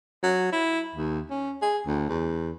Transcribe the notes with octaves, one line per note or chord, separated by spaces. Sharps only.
F#3
E4
D#2
C#4
G#4
D2
E2